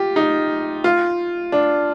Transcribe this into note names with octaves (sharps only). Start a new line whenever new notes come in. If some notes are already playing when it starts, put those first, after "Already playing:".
Already playing: F4 G4
D#4
F4
D4